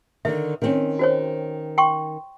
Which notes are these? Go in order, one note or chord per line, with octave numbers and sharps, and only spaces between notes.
D3 D#3 E5
D#3 C4 C#4
F#4 C5 C#5
G5 C6 C#6